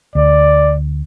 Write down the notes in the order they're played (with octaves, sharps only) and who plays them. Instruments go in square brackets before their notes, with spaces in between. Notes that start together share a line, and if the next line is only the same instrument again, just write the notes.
[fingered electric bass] D2 [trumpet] D5